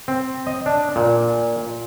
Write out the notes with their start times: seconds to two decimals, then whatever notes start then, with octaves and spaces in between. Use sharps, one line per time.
0.08 C4
0.47 D#5
0.66 D4
0.96 A#2